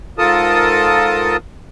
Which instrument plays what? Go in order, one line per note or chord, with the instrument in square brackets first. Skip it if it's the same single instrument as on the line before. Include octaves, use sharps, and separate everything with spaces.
[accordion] G#2 F4 A4 A#4 A5 D#6